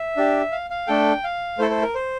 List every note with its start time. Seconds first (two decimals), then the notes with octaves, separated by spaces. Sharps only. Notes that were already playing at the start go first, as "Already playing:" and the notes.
Already playing: E5
0.17 D4 G4
0.52 F5
0.70 F5
0.87 A3 D4 A4 G5
1.24 F5
1.58 A3 E4 A4 C5
1.71 C5
1.82 A#4
1.95 C5